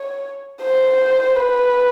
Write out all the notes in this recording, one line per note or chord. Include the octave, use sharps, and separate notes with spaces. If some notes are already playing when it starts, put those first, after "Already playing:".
Already playing: C#5
C5
B4